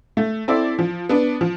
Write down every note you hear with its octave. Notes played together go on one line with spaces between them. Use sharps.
A3
C4 E4 A4 D5
F3
B3 D4
F3